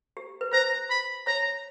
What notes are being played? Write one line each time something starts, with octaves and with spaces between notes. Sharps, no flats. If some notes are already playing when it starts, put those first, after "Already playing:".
G4
B4
C5 A#5
B5
C#5 A#5